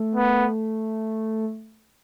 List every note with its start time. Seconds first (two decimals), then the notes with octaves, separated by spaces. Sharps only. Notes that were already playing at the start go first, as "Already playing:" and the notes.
Already playing: A3
0.15 B3